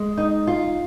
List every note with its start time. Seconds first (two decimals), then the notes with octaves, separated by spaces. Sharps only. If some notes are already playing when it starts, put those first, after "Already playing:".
Already playing: G#3
0.17 D#4
0.47 F4